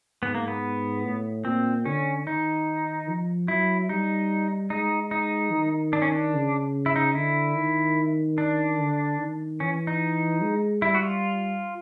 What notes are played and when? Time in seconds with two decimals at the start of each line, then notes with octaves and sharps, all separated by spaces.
0.23 G#2 B3
0.35 A#3
0.48 B3
1.05 A2
1.45 A#2 C4
1.86 D3 C#4
2.26 D#3 D#4
3.08 F3
3.48 F#3 E4
3.89 G3 D#4
4.70 G#3 D#4
5.11 D#4
5.52 D#3
5.93 D4
6.02 C#4
6.12 D4
6.34 C#3
6.86 E4
6.96 D#4
7.15 D3 E4
7.56 D#3
8.38 D4
8.78 D3
9.19 D#3
9.60 E3 C#4
9.87 D#4
10.41 G#3
10.82 G3 E4
10.95 F#4
11.02 F4